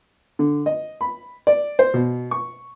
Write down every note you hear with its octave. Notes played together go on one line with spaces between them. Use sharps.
D3
D#5
B5
D5
C5
B2
C#6